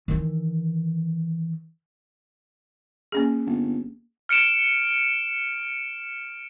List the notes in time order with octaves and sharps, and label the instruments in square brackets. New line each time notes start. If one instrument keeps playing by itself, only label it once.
[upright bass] D#3 E3
[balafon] A#3 C#4 G#4
[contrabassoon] G1
[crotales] F6 C#7 D7 E7